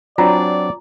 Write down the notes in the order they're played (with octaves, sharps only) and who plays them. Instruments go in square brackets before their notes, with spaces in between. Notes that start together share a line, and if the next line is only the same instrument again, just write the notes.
[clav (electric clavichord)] F#3 C4 D4 [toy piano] F4 G#5 A#5 [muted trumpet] D5